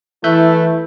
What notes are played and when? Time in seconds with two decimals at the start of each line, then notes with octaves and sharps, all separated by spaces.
0.24 E3 A3 E4 E5 F#6 G6